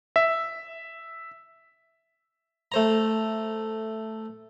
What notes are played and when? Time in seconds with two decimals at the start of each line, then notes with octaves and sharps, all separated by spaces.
0.16 E5
2.72 A3 C5 A#5